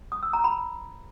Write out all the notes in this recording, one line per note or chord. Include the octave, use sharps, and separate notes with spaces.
D#6
E6
A#5
B5